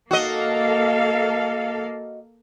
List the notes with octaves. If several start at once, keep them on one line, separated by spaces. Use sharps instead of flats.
A#3 F#4 A4 D#5 F5